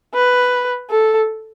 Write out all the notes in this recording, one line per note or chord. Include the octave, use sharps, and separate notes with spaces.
B4
A4